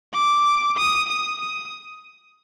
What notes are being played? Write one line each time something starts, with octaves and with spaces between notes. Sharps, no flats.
D6
D#6
D#6
D#6